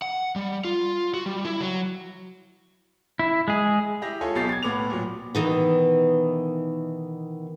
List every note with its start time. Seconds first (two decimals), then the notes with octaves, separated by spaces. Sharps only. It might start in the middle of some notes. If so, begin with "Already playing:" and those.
0.02 F#5
0.36 G3
0.65 F4
1.14 F#4
1.26 G3
1.44 E4
1.61 F#3
3.19 E4
3.48 G#3 G#4
4.02 E4 G4 A#6
4.21 F4 G#4 A4 C#5 G#5
4.35 B1 B2 G4 A6 C7
4.49 G#6 A6
4.63 A2 B3 D6 F7
4.90 A#2 F#3
5.35 B2 D#3 E3